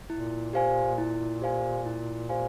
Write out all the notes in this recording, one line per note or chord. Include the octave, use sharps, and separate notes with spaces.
A#2 E4
G4 C5 F5 G#5
E4
G4 C5 F5 G#5
E4
G4 C5 F5 G#5